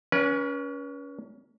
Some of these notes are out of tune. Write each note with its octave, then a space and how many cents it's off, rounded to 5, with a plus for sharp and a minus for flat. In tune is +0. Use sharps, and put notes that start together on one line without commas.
C#4 +25 B4 -35 G#5 +0